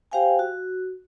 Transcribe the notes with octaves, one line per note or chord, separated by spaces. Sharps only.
G4 C5 F5 G5 G#5
F#4